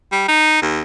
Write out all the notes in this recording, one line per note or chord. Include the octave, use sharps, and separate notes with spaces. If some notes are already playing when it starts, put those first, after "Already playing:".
G3
D#4
D#2